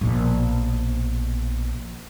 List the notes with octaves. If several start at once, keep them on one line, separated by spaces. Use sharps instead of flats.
A#1 B2